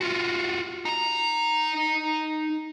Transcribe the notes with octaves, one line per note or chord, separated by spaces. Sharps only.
F4 F#4
D#4 A#5